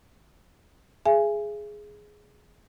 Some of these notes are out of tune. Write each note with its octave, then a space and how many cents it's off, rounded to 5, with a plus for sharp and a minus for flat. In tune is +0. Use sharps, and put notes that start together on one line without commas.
G#4 +5 E5 +40 G#5 +0